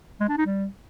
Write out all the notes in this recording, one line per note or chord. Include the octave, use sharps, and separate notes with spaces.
G#3
D4
D#4
G3